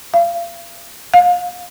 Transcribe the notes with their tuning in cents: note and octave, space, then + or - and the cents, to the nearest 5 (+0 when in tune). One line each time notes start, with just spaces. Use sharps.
F5 -40
F5 +30